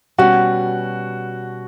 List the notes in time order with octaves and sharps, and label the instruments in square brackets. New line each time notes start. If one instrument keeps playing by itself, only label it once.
[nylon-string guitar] B2 G3 C#4 [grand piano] F#4